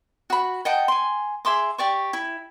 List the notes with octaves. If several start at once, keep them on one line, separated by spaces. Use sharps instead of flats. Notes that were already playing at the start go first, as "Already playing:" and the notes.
F#4 B5
D#5 F#5 G5 A5
G#5 C6
G#4 E5 C6 D6
G4 D5 C#6
E4